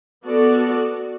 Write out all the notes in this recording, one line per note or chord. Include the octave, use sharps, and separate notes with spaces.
B3 F#4 A4 D5